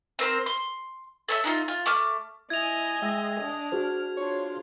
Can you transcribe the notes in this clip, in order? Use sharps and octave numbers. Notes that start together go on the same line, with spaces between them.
C4 A#4 C5
C6
A4 C#5 E5
D4 D#4 F4
F4
A3 D6 F6
E4 D#5 G#5 G#6 F7
G#3 E5 G5 E6
D4 D#5
F#4 G#4 C5 F6
D4 F4 C#5